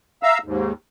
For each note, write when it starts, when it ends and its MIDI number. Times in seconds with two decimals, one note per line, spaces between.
0.23 0.38 76
0.23 0.38 77
0.23 0.38 82
0.23 0.38 88
0.44 0.73 39
0.44 0.73 44